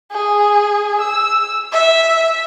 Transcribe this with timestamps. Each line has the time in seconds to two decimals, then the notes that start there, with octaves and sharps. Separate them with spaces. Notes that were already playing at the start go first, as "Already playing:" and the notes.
0.12 G#4
1.01 E6
1.73 E5